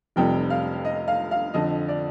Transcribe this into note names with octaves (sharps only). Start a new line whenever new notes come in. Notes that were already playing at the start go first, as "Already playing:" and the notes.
F1 F2 C3 G3 G5
F5
D#5
F5
F5
F2 D3 F3 D#5
D5